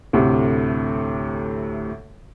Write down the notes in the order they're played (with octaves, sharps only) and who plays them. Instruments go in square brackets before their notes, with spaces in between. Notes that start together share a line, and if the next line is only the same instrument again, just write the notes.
[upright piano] D2 A2 C3